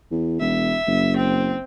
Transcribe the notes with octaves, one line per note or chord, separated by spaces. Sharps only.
E2
E1 E5
F#1
C4